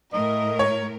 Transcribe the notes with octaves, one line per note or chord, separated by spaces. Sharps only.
A2 A#4 D#5
C#5